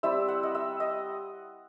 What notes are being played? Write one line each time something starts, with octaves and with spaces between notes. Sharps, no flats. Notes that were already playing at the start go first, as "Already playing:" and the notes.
G3 C4 E4 E5
F#5
D#5
E5
D#5